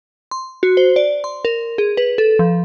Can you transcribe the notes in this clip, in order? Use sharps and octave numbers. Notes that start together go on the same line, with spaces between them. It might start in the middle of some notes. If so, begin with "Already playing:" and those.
C6
F#4
C5
D5
C6
A#4
G#4
B4
A4
F3